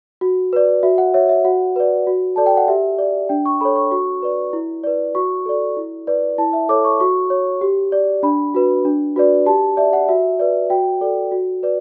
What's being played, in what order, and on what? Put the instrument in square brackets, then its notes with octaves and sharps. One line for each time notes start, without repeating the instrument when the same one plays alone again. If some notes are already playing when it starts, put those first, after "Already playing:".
[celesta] F#4
B4 D5
F#4 E5
F#5
C#5 E5
E5
F#4 F#5
B4 D5
F#4
A4 D5 A5
G5
F#5
G4 E5
D5
D4 G5
C#6
A4 C#5 B5
C#6
F#4 C#6
B4 D5
E4
B4 D5
F#4 C#6
A4 D5
E4
B4 D5
E4 A5
E5
A4 C#5 D6
C#6
F#4 C#6
C#5
G4
D5
D4 B5
F#4 B4
D4
F#4 B4 D5
G4 A5
D5 E5
F#5
F#4 E5
B4 D5
F#4 G5
A4 D5
F#4
B4 D5